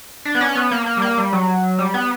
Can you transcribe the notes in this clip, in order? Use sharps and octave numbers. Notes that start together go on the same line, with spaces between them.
D4
B3
C#4
B3
A#3
A#3
G3
A#3
G3
F#3
G3
B3